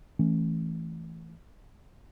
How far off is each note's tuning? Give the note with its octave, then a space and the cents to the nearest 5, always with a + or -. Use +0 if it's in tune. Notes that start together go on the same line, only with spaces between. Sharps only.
E3 -5 A3 +0 C#4 -25